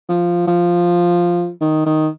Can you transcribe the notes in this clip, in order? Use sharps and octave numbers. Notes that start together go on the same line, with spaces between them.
F3
F3
D#3
D#3